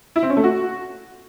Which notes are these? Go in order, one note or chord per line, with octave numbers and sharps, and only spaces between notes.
E4
C4
C#4
A3
F#4